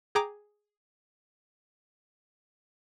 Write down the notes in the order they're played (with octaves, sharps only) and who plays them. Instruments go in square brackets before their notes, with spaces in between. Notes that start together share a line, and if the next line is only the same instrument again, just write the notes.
[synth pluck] G#4 G5 A#5 D6